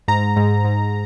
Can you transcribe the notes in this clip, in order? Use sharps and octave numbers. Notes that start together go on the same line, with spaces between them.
G#2 A#5
G#2
G#2